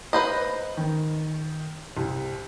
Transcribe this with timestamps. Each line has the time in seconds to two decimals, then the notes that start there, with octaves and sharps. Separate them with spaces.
0.13 B4 C5 D#5
0.77 D#3
1.97 C2